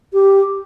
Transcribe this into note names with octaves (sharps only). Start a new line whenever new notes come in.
G4